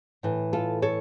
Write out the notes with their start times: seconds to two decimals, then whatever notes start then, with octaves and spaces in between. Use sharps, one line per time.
0.23 A2 E3
0.53 F4 A4
0.82 A4 C#5